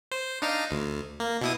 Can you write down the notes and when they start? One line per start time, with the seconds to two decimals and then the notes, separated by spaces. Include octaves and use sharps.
0.11 C5
0.42 D4 D#4 F5
0.71 D2
1.20 A#3
1.41 B2 E4 D#6